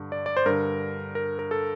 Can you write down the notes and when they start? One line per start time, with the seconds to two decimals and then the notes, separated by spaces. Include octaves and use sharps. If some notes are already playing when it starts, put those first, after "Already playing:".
Already playing: G2 D3
0.12 D5
0.26 D5
0.37 C5
0.46 G2 D3 A#4
1.15 A#4
1.39 A#4
1.51 A4